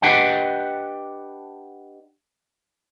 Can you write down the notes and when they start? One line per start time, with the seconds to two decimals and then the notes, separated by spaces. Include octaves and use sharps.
0.02 D4 G4 B4 D#5 F#5 G5